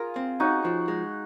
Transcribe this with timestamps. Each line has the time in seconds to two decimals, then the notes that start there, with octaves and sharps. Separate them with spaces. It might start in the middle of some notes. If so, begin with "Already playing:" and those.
Already playing: F4 G#4 A#4
0.16 C4
0.40 C#4 D#4 F#4
0.65 F3
0.88 G#3